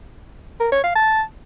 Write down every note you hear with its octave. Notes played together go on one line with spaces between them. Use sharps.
A#4
C#5
F5
A5